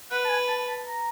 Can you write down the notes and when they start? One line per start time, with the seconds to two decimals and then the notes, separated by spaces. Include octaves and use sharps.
0.11 B4 F#5
0.25 A5
0.29 G#5
0.48 A5
0.68 A5
0.86 A#5